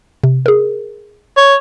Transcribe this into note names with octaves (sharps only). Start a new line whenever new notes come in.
C3
G#4 A#4
C#5